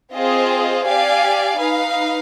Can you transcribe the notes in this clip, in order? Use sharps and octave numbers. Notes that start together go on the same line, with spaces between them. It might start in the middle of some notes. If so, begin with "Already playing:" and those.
C4 F4 G#4 C5 D#5
G4 D5 F5 G#5
D#4 B4 F5